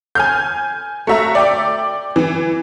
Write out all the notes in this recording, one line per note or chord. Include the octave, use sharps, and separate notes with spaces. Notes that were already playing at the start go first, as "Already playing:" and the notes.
G#5 F6 G6
A3 F#4 E5 A#5
D5 G5 D6
E3